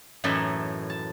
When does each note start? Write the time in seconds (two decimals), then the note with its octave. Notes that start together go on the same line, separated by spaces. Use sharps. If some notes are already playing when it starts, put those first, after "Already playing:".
0.24 F#2 A2 E3 D#4 A4 E5
0.90 A5